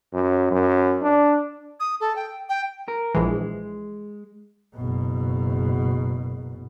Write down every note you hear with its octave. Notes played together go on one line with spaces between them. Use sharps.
F#2
F#2
D4
D#6
A4
G5
G5
A#4
A#1 E3 G#3
F#1 B2